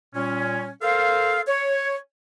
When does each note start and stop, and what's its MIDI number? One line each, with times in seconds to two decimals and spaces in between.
0.14 0.69 46
0.14 0.69 55
0.14 0.69 61
0.82 1.41 69
0.82 1.41 70
0.82 1.41 72
0.82 1.41 77
1.48 1.97 73